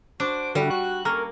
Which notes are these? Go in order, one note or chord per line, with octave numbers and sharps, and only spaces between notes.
D4 F#4 C5 D6
D3 G3 E4 F#4
F#4 F#6
A#3 C#4 A4 A#4